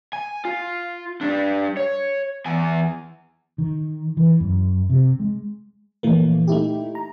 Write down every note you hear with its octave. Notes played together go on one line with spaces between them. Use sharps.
G#5
F4
G3 D4
C#5
E2 G#5
D#3
E3
F#2
C3
G#3
A#2 E3 F3 A3 A#3
A3 D#4 E4 G4
A#5